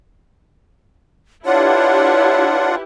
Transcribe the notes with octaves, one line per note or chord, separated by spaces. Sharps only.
D4 E4 F4 G4 B4 C#5 F#5